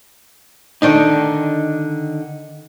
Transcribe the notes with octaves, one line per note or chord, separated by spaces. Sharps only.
D3 D#3 D4 D#4